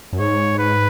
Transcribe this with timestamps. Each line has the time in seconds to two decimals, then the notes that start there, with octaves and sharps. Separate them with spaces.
0.13 F#2
0.19 G#2 C#5
0.59 B4